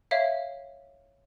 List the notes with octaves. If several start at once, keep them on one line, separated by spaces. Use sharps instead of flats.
C#5 E5 F5